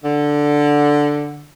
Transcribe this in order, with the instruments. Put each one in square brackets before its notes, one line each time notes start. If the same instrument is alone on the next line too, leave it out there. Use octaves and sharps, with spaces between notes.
[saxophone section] D3